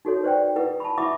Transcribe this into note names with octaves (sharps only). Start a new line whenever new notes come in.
D#4 F#4 A4 C#5
B4 C5 D5 F#5 G5
E4 B4 F#5 D#6
A5 B5
E4 E5 F#5 B5 D6 D#6